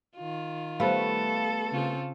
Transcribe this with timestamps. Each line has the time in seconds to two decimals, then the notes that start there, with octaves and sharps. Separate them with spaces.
0.17 D#3 F4
0.80 G3 A3 B3 A4 F5 B5
1.71 C#3 C4 F4